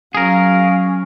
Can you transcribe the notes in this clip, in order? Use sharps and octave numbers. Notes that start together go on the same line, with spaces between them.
F#3 C#4 G#4 A#4 F5